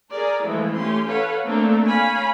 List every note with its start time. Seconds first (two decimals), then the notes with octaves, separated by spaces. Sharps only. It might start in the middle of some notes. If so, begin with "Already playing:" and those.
0.10 G#4 A#4 D5
0.43 E3 F3 G#3 A3 E4
0.76 A3 C#4 G4 C6
1.06 A4 B4 C#5 F5 F#5
1.44 A3 A#3 C4 D4 A4
1.86 C#5 F5 G#5 B5